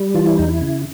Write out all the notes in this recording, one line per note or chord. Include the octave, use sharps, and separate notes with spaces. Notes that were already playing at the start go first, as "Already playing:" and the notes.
Already playing: G3
E3 F4
E4
E2 D#4
E4
C#3